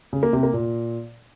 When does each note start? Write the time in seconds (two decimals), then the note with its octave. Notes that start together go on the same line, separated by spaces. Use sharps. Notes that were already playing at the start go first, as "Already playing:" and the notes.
0.13 C#3
0.23 A#3
0.33 C3
0.43 A#3
0.53 A#2